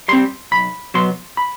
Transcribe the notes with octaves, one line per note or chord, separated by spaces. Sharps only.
G3 C4 C6
B1 B5
B2 F#3 B3 C6
B5